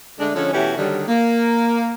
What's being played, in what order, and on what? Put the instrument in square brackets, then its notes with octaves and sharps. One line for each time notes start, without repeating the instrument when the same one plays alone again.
[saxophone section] D3 G#3 A3 D4
D3 F3 G#3 C#4
B2 E3 A3 C#4 F#4 G4
D3 D#3 F#3 G3
A#3